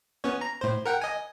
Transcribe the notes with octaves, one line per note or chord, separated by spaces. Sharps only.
B3 C#4 C#5
A#5
A2 C5
A#4 F#5 G5
D#5 G#5